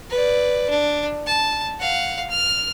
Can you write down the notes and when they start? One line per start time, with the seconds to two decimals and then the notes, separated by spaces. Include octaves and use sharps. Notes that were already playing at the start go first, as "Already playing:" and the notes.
0.10 B4 D5
0.70 D4
1.26 A5
1.80 F5 F#5
2.30 F6